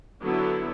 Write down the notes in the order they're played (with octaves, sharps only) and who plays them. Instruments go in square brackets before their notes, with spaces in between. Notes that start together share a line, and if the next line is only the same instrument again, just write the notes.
[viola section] D3 F#3 B3 E4